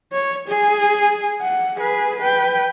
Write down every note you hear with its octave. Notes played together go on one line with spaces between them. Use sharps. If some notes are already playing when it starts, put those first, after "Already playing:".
C#5
G#4
F#5
G#4 B4
B4 G5